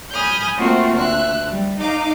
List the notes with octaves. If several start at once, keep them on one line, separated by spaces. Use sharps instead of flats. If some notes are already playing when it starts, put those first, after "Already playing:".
G#5 B5 D#6 F6 G6
A3 A#3 C4 F4 F#4 C5
D2 E5 F#6
G3
D#4 F5 D6